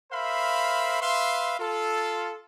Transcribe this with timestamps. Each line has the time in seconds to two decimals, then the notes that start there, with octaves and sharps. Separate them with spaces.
0.12 A#4 C5 E5 F5 B5
1.01 B4 E5 F5 C6
1.59 F4 A4